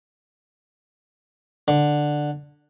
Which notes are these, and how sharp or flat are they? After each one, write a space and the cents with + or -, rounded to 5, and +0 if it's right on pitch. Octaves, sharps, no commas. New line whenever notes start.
D3 +5